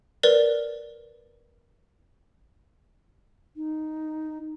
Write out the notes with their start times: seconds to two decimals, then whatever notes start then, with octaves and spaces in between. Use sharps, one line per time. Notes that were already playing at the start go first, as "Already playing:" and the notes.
0.23 A#4 B4 D5
3.56 D#4